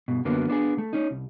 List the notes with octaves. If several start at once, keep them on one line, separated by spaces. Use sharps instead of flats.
G2 B2
F#2 D3 A#3 B3
B3 D4 E4 G#4
A3
C#4 D#4
C2